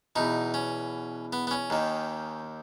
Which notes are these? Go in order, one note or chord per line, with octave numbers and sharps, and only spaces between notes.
E2 B2 D#4
C#4
B3
B3
C#4
D#2 D#3